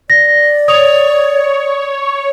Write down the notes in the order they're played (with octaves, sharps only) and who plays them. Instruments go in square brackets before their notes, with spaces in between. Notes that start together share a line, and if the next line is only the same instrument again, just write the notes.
[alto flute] D5 [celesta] A#6
[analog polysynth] C#5 [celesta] D#6 F7